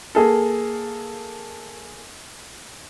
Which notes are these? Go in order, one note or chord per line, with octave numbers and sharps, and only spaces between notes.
A#3 G#4 A4